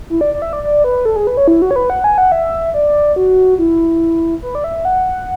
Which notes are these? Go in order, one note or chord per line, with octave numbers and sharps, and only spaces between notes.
E4
D5
D5
E5
D5
D5
B4
A4
G#4
B4
C#5
E4
F#4
C#5
B4
F#5
G#5
F#5
E5
D5
F#4
E4
B4
D5
E5
F#5